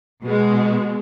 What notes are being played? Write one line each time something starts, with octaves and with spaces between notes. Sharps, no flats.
B2 G#3